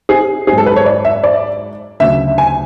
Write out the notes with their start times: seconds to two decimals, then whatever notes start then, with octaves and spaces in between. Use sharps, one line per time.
0.09 G#4
0.47 G#2 F#3 G#4
0.58 A4
0.66 B4
0.76 C#5
0.86 D5
1.05 E5
1.24 D5
2.00 D2 C#3 F#3 E5
2.38 G#5